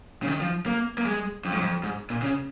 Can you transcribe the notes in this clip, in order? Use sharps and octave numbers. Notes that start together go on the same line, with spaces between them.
C#3
D#3
F3
A#3
A#3
G#3
F2
G#2
F2
G#2
A#2
C#3